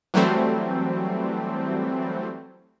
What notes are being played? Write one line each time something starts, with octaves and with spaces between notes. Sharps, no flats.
E3 F#3 G3 A3 C4